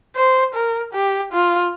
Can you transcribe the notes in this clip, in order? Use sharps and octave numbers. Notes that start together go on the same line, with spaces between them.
C5
A#4
G4
F4